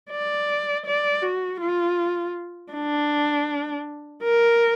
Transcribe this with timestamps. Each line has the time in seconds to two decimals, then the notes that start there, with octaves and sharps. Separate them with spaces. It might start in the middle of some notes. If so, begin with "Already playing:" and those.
0.10 D5
0.86 D5
1.22 F#4
1.61 F4
2.73 D4
4.23 A#4